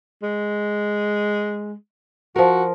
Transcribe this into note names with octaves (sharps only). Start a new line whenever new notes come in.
G#3
F3 F#4 A#4